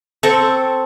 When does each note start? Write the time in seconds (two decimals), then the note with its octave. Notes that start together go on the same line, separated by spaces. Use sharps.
0.23 C4 A4 C#6